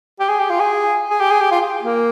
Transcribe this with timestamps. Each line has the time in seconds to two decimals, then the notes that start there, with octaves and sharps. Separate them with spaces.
0.20 G4
0.29 G#4
0.39 G4
0.49 F4
0.59 G#4
1.10 G#4
1.20 G4
1.31 G#4
1.41 G4
1.51 F4
1.83 A#3